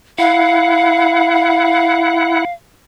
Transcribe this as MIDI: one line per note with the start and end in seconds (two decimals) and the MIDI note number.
0.18 2.45 64
0.18 2.53 77
0.18 2.45 78